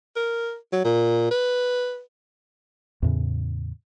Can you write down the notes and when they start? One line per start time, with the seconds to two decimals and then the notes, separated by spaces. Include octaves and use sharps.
0.16 A#4
0.73 F#3
0.85 A#2
1.31 B4
3.02 E2 A2 C#3